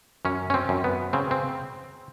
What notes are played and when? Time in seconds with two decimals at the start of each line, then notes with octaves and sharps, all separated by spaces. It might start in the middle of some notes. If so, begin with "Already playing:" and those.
0.25 F#2 C#4
0.50 C#4
0.54 C4
0.69 F#2
0.84 B3
1.13 C#3 C4
1.31 C4